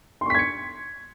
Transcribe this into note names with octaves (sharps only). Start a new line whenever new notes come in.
C6 C#6 G#6 B6 C#7